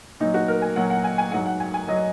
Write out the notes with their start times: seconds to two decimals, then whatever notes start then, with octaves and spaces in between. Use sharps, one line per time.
0.20 A#2 F#3 D#4
0.34 F#4
0.48 A#4
0.62 G#5
0.76 A#2 F#3 F#5
0.90 F#5
1.04 G#5
1.18 G#5
1.32 G#2 F#3 F#5
1.46 F#5
1.60 G#5
1.74 G#5
1.88 F#3 D#5